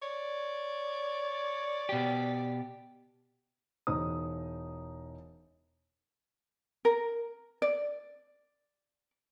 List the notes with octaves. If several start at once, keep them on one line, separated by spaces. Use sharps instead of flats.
C#5 D5
B2 G4
E1 D#4 C5 D#6
A#4
D5